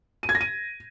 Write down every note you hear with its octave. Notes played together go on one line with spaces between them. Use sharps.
D#7
G#6
A#6
D#7